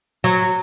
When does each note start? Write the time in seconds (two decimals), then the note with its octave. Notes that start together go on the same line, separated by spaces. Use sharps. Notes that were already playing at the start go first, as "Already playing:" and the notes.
0.24 F#3